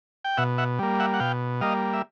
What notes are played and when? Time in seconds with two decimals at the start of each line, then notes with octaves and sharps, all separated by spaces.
0.25 G5
0.37 B2 E5 F#5
0.58 E5 F#5
0.79 G3 A#3
1.00 E5 F#5
1.14 F#5
1.20 B2 F5 G5
1.61 G3 A#3 D#5 F5
1.93 E5